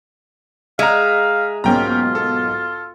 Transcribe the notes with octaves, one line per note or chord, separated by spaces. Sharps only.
G#3 E5 F5 A#5
B1 G#2 A#3 C#4 F4 G5 A#5
A4